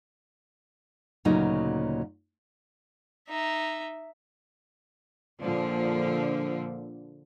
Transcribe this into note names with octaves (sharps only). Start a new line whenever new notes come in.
D2 A#2 C#3 F#3 D#4
D#4 E5
A#2 D3 F3